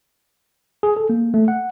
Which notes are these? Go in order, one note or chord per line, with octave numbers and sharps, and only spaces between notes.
G#4
A4
A#3
A3
F#5